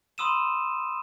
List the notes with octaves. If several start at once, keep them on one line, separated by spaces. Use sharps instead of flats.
B5 C6 D#6 E6 D#7 E7